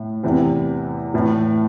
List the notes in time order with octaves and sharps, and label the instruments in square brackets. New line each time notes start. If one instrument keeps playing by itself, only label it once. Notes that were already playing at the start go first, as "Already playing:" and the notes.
Already playing: [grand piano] A2
E2 C3 E3
A2 E3